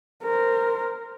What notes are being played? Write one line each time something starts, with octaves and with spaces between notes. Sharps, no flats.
A#4 C5